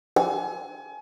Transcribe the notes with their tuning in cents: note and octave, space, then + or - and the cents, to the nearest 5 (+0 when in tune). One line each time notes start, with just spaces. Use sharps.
G#5 +35